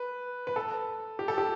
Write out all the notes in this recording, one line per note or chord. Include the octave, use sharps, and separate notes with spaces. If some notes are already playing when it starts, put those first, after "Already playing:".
Already playing: B4
B4
A4
G4
A4
G4